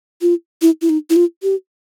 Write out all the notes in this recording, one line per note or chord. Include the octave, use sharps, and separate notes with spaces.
F4
E4
E4
D#4
E4
F4
G4